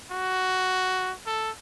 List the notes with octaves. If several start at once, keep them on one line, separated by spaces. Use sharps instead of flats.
F#4
A4